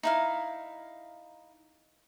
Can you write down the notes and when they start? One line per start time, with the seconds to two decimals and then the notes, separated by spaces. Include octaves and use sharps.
0.03 D#4 E4 F5